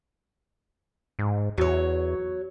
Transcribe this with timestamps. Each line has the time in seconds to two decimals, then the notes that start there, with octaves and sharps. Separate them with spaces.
1.19 G#2
1.58 E2 F#3 C#5